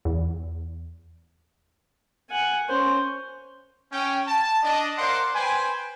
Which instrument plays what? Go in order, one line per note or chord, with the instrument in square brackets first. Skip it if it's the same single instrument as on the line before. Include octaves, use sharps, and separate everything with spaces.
[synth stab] E2
[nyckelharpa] F#5 G#5
C#4 C5
[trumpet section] C#4 G5
A5
D4 D#5
A#4 C5 D5 F5 F#5 C6
B4 C5 G5 G#5